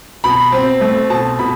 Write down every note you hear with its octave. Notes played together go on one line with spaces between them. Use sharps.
B2 B5
C4
A3
B2 A5
B2 B5